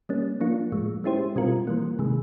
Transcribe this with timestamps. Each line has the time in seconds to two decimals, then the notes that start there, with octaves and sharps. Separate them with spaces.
0.09 G3 A#3 C#4
0.40 F3 A#3 D4 F4
0.72 A2 F3 G#3
1.04 G#3 C#4 E4 G4 C5
1.36 B2 G3 C4 F4 A#4
1.67 E3 G3 A#3
1.99 C3 D#3 G#3